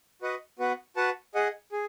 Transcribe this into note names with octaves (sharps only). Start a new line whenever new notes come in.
F#4 B4 D#5 F#5
B3 F#4 B4 F#5
F#4 B4 F#5 A5
G#4 D#5 F#5
G#4